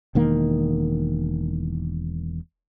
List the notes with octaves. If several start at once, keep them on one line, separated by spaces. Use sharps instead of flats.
E1 D#3 A#3